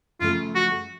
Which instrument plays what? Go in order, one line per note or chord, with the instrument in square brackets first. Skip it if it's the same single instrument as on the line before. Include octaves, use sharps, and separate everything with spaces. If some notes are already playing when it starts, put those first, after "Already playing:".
[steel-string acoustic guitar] F#2 C#3 F3 A3 [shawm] F4
[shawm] F#4